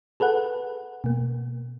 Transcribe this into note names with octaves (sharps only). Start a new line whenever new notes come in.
G#4 A4 B4 F#5
B2 A#3